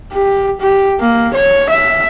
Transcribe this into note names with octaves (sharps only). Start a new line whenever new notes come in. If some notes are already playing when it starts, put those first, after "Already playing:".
G4
G4
A#3
C#5
E5